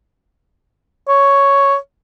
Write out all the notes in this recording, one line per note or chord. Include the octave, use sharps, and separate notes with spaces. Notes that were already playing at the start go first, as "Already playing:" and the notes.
C#5